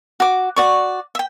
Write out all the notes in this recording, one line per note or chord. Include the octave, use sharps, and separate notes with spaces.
F#4 D6
F#4 D5 C#6
E5 G5